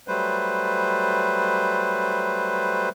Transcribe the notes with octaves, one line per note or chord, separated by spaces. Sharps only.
F#3 G3 A3 B4 C5